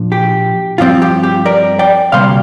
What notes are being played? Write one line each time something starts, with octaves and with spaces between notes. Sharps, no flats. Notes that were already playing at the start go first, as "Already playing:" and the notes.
Already playing: A#2 F3 D4
G4
G2 F3 C4 F4
G4
G4
A#4 D5
D5 G5
D2 C3 G3 A#3 C5 F5